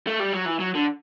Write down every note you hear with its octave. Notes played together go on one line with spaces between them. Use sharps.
A3
G3
F#3
E3
F#3
D3